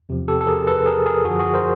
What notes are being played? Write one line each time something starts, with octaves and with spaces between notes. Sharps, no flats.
E2 C3 F3
G4 A4
A4
G#4 A#4
A4 B4
G#4 A#4
G#4 A#4
F#2 D3 F3 F#4 G#4
F#4 G#4
A#4 C5